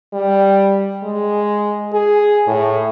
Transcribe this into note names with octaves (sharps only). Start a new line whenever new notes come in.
G3
G#3
G#4
A2